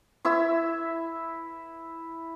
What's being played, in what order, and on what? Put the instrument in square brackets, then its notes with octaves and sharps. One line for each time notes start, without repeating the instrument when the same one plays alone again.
[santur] E4 E5 E6